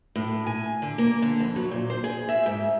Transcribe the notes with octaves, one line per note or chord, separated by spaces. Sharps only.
A2
G#5
D3
A#3
D3
F2
F#3
A#2
C5
G#4
E5
G#2